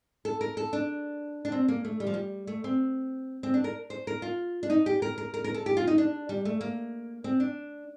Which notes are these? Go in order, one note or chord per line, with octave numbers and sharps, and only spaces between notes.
A4
A#4
A4
D4
D4
C4
A#3
A3
G3
F3
G3
A3
C4
C4
D4
A#4
C5
A#4
F4
D4
D#4
G4
A#4
A#4
A#4
A#4
A4
G4
F4
D#4
D4
G3
A3
A#3
C4
D4